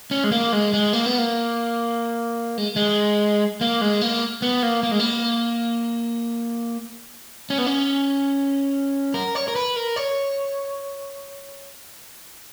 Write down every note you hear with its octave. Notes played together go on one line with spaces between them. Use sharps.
C#4
G#3
A#3
G#3
G#3
A#3
B3
A#3
G#3
G#3
A#3
G#3
A#3
B3
A#3
A#3
G#3
A#3
C#4
B3
C#4
A#4
C#5
A#4
B4
A#4
C#5